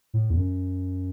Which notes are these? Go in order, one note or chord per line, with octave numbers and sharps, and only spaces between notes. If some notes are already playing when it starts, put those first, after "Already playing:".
A2
E2
F#2